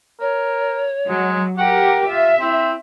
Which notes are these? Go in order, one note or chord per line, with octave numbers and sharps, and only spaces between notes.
A#4 C#5
F#3 G#3
G4 A#4 F#5 G5
F4 E5
C4 E4